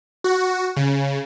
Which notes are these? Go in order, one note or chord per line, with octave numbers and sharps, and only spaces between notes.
F#4
C#3